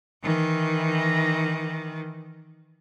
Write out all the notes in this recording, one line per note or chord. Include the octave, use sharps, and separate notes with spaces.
D#3 E3